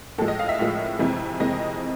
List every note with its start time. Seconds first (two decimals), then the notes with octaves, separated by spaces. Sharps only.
0.18 A2 F3 G#3 A4
0.28 D#5
0.39 F5
0.49 E5
0.59 A2 F3 G#3
0.99 F2 C3 E3 G#3
1.40 F2 C3 E3 G#3 D#5